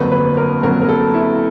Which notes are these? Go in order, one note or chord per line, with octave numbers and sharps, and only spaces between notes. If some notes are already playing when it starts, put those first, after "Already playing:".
Already playing: G1 F2 D3 F#3 A#3 B4
B4
A#4
G1 F2 D3 F#3 A#3 A#4
A#4
A4
E4